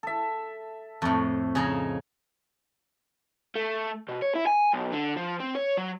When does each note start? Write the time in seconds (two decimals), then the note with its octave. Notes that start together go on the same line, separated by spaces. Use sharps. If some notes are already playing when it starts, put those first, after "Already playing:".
0.03 A4 E5
1.02 F2 A2 A3
1.55 C#3 F3 D#4 G#4 G#5 A#5
3.56 A3
4.09 B2
4.22 C#5
4.35 E4
4.47 G#5
4.74 B1
4.93 D3
5.17 F3
5.40 C4
5.55 C#5
5.77 F#3